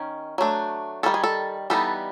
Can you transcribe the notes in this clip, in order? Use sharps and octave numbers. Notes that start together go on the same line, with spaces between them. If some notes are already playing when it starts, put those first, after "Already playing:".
Already playing: D#3 C#4
F#3 A3 D4
D#3 G3 A#3 C#4 A4
G#4
A4
E3 G3 B3 D#4 A4